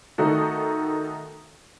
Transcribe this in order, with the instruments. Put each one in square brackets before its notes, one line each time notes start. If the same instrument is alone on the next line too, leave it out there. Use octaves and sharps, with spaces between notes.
[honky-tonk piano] D#3 A3 D#4 F#4 A4